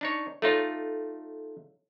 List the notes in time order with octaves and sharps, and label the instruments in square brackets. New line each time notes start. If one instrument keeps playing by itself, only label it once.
[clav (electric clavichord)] D4 D#4 C#5
[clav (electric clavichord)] A3 D#4 F4 [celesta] A4 C#5